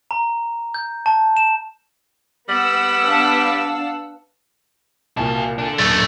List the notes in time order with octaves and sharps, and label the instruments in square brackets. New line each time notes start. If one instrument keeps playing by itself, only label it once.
[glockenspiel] A#5
G6
A5
E7
[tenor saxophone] G3 [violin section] B3 F#5 E6
[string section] D4 F5
[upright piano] C2 A#2 A#3 [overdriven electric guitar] F#4 A5
[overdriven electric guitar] D4 A4
[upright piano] D#1 [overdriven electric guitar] F#2 D4 [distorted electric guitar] D#3 A3